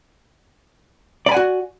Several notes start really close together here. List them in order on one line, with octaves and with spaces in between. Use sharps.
D5 B5 G#5 F#5 F#4